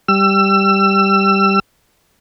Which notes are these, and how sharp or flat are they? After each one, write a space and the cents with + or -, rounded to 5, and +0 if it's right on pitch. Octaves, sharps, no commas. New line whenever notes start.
G3 +0 E6 +30